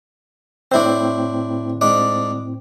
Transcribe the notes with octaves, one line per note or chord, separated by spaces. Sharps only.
A2 C4 D4 E4 C5
G#2 D4 D6